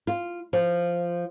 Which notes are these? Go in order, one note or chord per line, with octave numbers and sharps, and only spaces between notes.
F4
F3